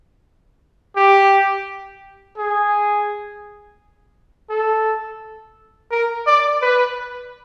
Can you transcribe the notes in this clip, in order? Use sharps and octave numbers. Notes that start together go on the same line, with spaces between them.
G4
G#4
A4
A#4
D5
B4